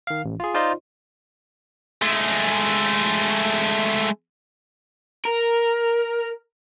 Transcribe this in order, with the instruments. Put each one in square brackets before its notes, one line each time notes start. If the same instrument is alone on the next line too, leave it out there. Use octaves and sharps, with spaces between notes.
[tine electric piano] D#3 F5
A1
F4 G#4
D#4 F4 C5 D5 D#5 C6
[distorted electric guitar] G#3 A3
[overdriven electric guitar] A#4